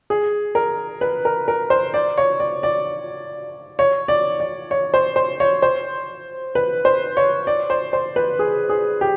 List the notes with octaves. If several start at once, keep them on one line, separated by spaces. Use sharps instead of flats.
G#4
A#4
B4
A#4
A#4
C5
D5
C#5
D5
D5
C#5
D5
D5
C#5
C5
C5
C#5
C5
B4
C5
C#5
D5
C5
C5
B4
G#4
G#4
G4